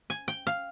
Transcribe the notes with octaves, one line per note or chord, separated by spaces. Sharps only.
G#5
G5
F5